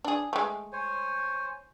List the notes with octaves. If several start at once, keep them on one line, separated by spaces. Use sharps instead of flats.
D4 G#4
G#3 A3
C5 C#5 G#5